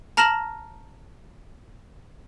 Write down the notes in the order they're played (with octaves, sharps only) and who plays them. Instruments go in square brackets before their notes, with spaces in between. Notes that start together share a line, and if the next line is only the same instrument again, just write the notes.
[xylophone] A5 A#5 F6 A#6 E7 F#7